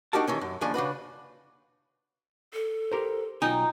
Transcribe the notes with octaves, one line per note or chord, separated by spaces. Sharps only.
D4 D#4 F#4 G4 A#4 A5
D#3 E3 C#4
F#2
D#2 C#3 F3 D4 G#5
C#3 D4 F#4 B4
A4
G4 A#4 C5
B1 D#4 F4 G5 G#5